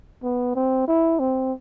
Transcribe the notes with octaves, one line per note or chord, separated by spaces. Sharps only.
B3
C4
E4
C4